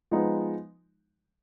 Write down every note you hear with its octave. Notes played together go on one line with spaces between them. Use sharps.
F3 G#3 B3 D#4